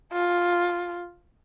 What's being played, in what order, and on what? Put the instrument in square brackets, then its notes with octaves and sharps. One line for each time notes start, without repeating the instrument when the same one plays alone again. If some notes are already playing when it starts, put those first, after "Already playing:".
[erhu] F4